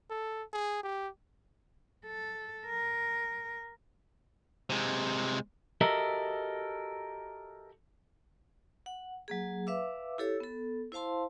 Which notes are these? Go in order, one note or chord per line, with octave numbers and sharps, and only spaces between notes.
A4
G#4
G4
A4
A#4
C3 G#3
F#4 G4 A4 A#4 D#5 E5
F#5
F#3 A#3 G#4
B4 E5 F5 D6 E6
E4 G4 A4 C#5 E6
B3 A4
E4 C5 F5 A5 C6